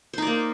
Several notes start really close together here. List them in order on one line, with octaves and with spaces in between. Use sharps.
C5 D#4 D5 A#3